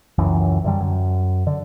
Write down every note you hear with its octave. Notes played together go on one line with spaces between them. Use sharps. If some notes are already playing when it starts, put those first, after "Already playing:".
C#2 F#2 E3
F#2 D3 G3
F#2
D3